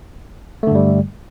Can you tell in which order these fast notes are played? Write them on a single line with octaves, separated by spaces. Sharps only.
A3 D3 G2 G3